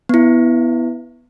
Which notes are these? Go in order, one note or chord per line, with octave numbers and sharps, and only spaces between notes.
B3 E4